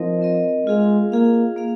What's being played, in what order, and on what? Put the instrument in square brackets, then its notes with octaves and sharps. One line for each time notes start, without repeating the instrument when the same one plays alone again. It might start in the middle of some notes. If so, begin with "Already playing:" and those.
Already playing: [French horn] F3 [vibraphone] C4 D#4 A#4 D#5
[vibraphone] C4 D#4 A#4 D#5
[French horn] G#3 [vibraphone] F4 G#4 F5
[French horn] A#3 [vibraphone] F4 G#4 F5
[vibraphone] A#3 G#4 F5